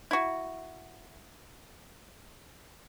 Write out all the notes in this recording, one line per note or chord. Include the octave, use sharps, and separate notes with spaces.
E4 F#4